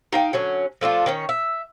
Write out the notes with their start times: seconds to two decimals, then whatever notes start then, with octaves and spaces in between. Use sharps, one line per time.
0.13 D#4 F5 G5
0.33 D3 F#3 C#4
0.81 F3 A3 D4 F4
1.06 D#3 C#4 C#5
1.29 E5